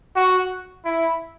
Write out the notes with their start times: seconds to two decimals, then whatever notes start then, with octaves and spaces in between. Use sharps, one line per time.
0.16 F#4
0.85 E4